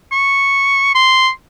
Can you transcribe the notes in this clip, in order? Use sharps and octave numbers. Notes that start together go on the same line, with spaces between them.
C#6
C6